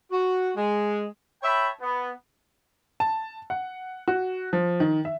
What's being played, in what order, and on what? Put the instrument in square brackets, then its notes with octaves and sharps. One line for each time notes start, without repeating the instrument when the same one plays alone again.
[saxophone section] F#4
G#3
[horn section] C#5 E5 G5 A5 B5
B3
[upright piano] A5
F#5
F#4
F3
D#3
E5